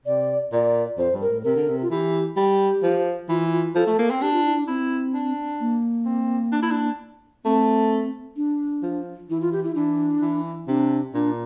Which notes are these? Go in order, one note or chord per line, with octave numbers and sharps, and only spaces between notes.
C3 D5
A#2 D5
F2 C5
G2
A#4
A2
C3 A#4
D3
C3
F4
E3 G4
G3 G4
F3
E3 F4
F4
F3 A4
A3
A#3
C4
D4 G4
F4
E4
D4
C4 E4
D4
A#3
C4
D4
E4
D4
A3 C4
D4
F3
E3 E4
F4
G4
E4
E3 D4
E3
C3 D4
A#2 D4